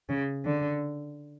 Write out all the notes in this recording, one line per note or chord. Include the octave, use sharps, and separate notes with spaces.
C#3
D3